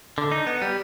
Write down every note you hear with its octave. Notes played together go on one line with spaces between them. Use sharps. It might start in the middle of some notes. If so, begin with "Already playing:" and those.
D3
D#4
B3
G3